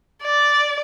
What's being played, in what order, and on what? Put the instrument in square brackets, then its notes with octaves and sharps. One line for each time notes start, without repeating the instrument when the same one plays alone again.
[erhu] D5